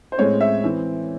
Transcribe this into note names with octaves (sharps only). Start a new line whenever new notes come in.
C5
A2 G#3 C4 C#5
E5
E3 C4